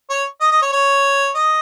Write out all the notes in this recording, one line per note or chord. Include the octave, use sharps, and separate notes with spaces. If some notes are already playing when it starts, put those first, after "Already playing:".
C#5
D#5
D#5
C#5
C#5
D#5